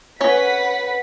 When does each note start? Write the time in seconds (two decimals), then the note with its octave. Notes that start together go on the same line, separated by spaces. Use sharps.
0.21 C#4 B4 C#5 F#5 B6